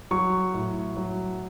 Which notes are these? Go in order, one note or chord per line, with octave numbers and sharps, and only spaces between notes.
F#3 C#6
A2
F#3